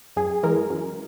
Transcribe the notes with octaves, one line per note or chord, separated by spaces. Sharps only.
F#2 G#4
E3 G#3 A#4
F#2